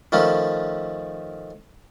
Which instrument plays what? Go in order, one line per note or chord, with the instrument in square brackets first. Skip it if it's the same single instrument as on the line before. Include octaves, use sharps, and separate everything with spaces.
[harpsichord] D#3 F3 A3 C#4